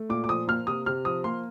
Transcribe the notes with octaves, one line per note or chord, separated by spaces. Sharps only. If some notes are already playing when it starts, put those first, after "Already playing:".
Already playing: A3
A#2 D6
D6
F3 D#6
A#3 F6
C3 D#6
C3 F6
F3 D#6
A#3 C6